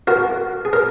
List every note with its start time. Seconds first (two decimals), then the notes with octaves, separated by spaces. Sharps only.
0.07 F#4 A#4
0.65 G#4
0.73 A#4